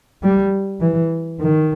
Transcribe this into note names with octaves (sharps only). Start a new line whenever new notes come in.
G3
E3
D#3